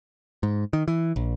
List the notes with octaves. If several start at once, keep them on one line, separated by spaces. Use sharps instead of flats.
G#2
D#3
E3
A#1